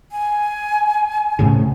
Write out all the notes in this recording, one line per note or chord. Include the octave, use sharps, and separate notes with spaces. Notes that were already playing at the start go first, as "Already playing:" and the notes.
G#5
C2 A2 C#3